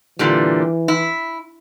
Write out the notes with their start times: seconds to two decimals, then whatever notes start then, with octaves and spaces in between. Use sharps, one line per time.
0.19 A#2 D3 E3 G3
0.88 E4